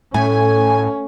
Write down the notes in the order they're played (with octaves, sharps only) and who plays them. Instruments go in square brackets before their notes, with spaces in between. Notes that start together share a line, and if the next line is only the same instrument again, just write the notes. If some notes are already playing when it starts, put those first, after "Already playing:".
[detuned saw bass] A2 [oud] A3 [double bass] C#4 [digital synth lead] G#5